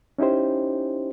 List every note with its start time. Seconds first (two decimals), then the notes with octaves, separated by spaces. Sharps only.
0.18 C#4 D#4 E4 G4 C5